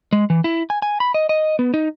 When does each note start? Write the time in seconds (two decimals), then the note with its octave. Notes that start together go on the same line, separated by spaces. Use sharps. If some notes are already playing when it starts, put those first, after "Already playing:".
0.13 G#3
0.30 E3
0.44 E4
0.70 G#5
0.82 G#5
1.00 B5
1.14 D#5
1.29 D#5
1.59 B3
1.74 D#4